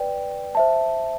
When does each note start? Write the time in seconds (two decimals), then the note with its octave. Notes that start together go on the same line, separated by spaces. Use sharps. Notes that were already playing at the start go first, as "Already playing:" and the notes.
Already playing: B4 D5 G5
0.55 C5 E5 A5